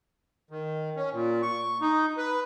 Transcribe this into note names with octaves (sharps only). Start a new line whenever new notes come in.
D#3
C#4
A#2
C#6
D#4
B4